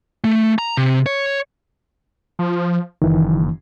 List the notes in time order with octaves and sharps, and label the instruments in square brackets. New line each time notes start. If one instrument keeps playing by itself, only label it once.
[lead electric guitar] A3
A#5
C3
C#5
[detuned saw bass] F3
[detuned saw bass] F#1 [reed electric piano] D#3 E3